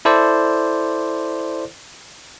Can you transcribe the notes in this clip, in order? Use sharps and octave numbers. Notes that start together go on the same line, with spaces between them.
E4 A4 C5 D5